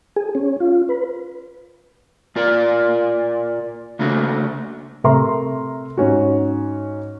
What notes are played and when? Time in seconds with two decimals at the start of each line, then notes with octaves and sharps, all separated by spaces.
0.16 G#4
0.35 C#4
0.60 F4
0.89 B4
2.36 A#2 F4 A#4 D5
3.99 C#3 A3 A#3 D4 F#4
5.04 C3 A3 A#4 E5 A#5 C6
5.97 G#2 C#4 F#4